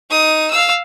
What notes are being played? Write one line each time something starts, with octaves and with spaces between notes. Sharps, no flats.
D#4 D#6
F5 E6